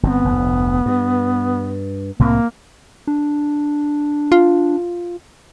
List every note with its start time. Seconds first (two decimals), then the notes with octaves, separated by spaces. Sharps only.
0.03 G1 C3 B3 C4
0.25 F1 D2
0.86 G2
2.19 C2 A2 A#3 C4
3.07 D4
4.32 F4